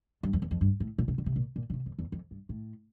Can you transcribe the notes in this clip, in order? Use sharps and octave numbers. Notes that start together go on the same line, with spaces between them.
G2
F2
E2
F2
G2
A2
A#2
C3
D3
C3
A#2
A#2
D3
C3
F2
E2
F2
G2
A2